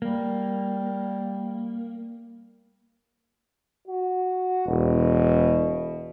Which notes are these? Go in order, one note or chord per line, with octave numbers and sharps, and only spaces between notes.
G3 A#3
F#4
E1 B2